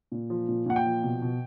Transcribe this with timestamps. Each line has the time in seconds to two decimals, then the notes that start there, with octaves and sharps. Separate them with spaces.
0.12 A#2
0.30 F3
0.48 A#2
0.66 A#2 F#5
0.76 G5
0.86 F3
1.04 B2
1.22 B2